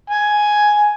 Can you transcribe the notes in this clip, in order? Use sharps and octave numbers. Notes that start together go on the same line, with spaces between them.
G#5